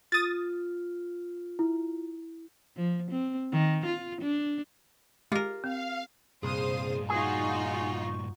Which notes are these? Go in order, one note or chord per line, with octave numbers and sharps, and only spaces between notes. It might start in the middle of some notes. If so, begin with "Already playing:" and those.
F4 D#6 A6
E4
F3
C4
D#3
F4
D4
G#3 F4 G4 A#4
C4 F5
C2 G2 A#2 G#4 C5 F5 D#6
D#4 F4 F#4 G#4 C#6